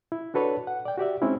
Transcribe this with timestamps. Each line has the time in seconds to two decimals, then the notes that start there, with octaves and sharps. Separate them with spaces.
0.12 E4
0.34 D4 F#4 A4 B4 C#5 D5
0.67 F#5
0.85 D5 G5
0.98 F#4 G4 D5 E5
1.22 G#3 C4 C#4 D#4 E4